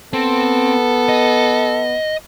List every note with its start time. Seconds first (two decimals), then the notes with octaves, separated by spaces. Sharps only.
0.13 B3 C4 A4
1.09 D#5